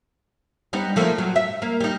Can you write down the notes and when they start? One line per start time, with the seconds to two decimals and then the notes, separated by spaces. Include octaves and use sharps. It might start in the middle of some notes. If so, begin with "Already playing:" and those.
0.73 G3 B3 D#4
0.96 F3 A3 A#3
1.18 F#3
1.36 E5
1.62 A#3
1.80 G3 D#4